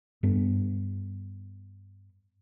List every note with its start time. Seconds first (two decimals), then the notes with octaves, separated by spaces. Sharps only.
0.23 G2 B3